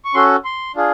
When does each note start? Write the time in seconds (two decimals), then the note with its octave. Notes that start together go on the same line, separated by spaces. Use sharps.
0.05 C#6
0.14 C#4 F#4 A4 C6
0.45 C6
0.75 D4 F4 G#4